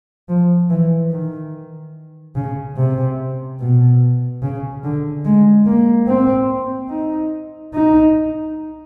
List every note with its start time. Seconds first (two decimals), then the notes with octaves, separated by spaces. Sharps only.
0.29 F3
0.70 E3
1.12 D#3
2.36 C#3
2.77 C3
3.60 B2
4.42 C#3
4.84 D3
5.25 G#3
5.66 A#3
6.07 C4
6.90 D#4
7.74 D#4